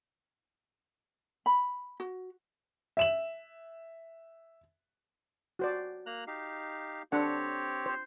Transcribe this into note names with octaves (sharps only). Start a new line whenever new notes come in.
B5
F#4
E5 E7 F#7
F#4 C5 D5
A#3 A#5 F#6
D#4 G4 F5
C4 D4 G4 A4 C#5 F#5
C5